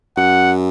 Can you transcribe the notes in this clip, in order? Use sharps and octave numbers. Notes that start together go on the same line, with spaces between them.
F#2 F#5